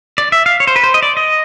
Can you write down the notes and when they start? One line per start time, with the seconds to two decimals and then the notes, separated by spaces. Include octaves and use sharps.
0.18 D5
0.32 E5
0.46 F5
0.60 C#5
0.67 C5
0.76 B4
0.84 C5
0.94 D#5
1.02 D5
1.17 D#5